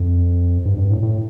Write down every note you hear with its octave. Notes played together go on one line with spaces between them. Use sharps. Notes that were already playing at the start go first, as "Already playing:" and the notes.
Already playing: F2
G2
G2
A2
A2